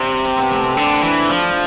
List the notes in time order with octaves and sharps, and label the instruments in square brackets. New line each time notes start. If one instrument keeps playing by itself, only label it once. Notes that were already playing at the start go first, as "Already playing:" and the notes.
Already playing: [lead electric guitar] C3 [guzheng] G3
[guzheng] C4
B3
A3
C4
[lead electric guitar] D3 [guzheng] D4
[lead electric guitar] E3 [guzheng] E4
[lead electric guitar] F3 [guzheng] D4